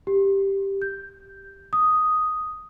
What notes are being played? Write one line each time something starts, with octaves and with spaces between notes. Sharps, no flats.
G4
G6
D#6